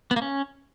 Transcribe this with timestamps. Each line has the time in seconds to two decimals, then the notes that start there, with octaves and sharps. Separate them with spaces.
0.11 B3
0.16 A#3
0.22 C#4